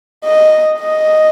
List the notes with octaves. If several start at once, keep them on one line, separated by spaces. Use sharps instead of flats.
D#5
D#5